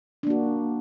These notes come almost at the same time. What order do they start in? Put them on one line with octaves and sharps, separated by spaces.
D4 A#3 F#4